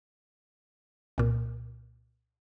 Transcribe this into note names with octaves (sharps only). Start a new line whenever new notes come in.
C2 A#2